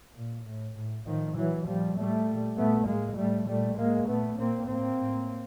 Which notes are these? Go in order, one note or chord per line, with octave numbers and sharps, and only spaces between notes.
A#2
A2
A2
A2 D#3 F3
A#2 E3 F#3
A#2 F3 G3
A2 G3 A3
A#2
A#2 A3 B3
A2 G#3 A#3
A2 G3 A3
A#2 G3 A3
A2 G#3 A#3
A#2 A3 B3
A#2 A#3 C4
A2 A#3 C4
A2